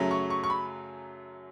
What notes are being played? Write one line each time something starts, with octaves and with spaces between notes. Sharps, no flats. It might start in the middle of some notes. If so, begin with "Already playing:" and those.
Already playing: F#2 C#3 F#3 A3
C#6
C#6
C#6
B5